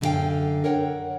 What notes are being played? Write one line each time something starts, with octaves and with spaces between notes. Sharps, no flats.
F#2 D3 D#4 G#4 F5 G5
A#4 C#5 F#5 G5